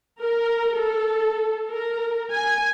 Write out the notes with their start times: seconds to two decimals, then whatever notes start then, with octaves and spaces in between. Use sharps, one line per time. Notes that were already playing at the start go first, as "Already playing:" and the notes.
0.21 A#4
0.77 A4
1.68 A#4
2.32 G#5